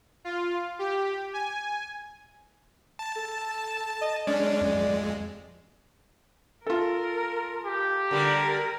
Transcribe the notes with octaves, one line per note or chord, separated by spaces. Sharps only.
F4
G4
G#5
A5
A4
D#5
G#3 C#4 D4 D5
F2 G#3
F4 A4 A#4
G4
D3 G3 A#4